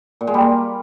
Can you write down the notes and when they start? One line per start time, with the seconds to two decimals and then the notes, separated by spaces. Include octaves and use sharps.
0.21 A#2
0.27 G#3
0.34 G3
0.41 A#3